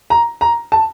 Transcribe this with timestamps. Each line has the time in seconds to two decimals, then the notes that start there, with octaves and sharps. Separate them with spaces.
0.10 A#5
0.41 A#5
0.72 A5